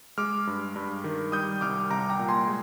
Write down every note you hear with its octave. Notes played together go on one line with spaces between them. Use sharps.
G#3 D6 F6
G2
G2
D#3
G3 D#6 G6
C2 D6 F6
C2 A#5 D6
G5 A#5
A#2
G#5 C6
G#3